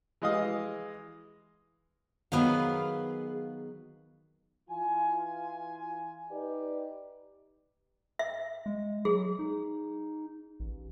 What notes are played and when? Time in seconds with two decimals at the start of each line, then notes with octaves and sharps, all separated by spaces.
0.22 E3 G#3 D#5 F5 D#6
2.32 D#3 F#3 B3 G#4 B4 F5
4.70 E3 F4 G#5
6.30 D#4 G4 B4 D5
8.19 E5
8.66 G#3
9.05 F#3 G#4
9.39 D#4
10.60 A1